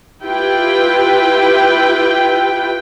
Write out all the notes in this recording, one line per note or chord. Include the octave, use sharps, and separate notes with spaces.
E4 F4 G4 B4 G5